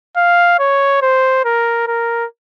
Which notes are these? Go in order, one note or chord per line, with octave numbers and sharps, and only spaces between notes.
F5
C#5
C5
A#4
A#4